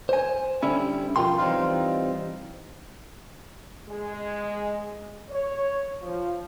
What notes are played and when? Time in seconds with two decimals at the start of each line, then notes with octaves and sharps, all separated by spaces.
0.09 C5 G#5
0.63 D3 G3 C#4 E4
1.16 B1 F3 F4 A#4 G5 C6
1.38 E3 G3 C4 D#4 F4
3.88 G#3
5.29 C#5
6.01 F3